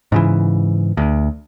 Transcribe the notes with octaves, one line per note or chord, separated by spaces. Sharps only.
G#2 C#3 E3
D2